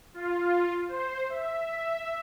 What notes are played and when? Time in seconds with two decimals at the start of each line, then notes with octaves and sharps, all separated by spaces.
0.14 F4
0.88 C5
1.30 E5